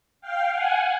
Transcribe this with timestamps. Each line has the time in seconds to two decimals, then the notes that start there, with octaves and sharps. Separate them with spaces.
0.21 F5 G5
0.51 F#5 G#5